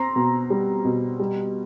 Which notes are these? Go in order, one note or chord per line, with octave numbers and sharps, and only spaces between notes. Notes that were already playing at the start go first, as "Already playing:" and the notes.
Already playing: C4 A#5 C6
B2
G3
B2
G3